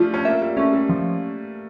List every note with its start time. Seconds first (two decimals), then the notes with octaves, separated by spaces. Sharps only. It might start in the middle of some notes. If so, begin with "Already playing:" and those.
Already playing: F3 G3 A3 D4 F4
0.14 C#4
0.25 A#3 E5
0.42 G3
0.57 A3 C#4
0.73 G3
0.89 F3